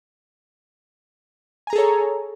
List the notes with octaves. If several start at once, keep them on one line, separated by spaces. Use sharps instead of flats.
G#4 A4 C#5 G#5 A#5